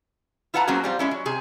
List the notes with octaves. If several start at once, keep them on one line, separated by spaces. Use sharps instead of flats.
E4 F4 B4 F#5 A5 A#5
F#3 A#3 C4 C#4 F#4 G#4
G3 C4 F4
G#3 C#4 E4
F#3
C3 G#4